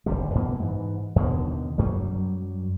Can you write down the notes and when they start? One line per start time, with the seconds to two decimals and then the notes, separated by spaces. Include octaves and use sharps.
0.06 D1 C2 D3 G3
0.35 F#2 B2 E3 A#3
0.59 G#2 E3
1.16 D#2 B2 D3 D#3
1.78 F#2 F#3 G3